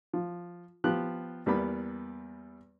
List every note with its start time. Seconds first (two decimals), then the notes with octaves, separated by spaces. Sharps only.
0.13 F3
0.84 F3 B3 G4 F#6
1.46 E2 G3 A#3 B3 B5